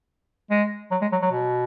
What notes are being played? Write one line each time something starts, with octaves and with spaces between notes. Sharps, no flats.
G#3
F#3
G#3
F#3
F#3
B2